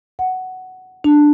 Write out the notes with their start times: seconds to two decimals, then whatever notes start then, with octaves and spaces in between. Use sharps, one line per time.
0.19 F#5
1.04 D4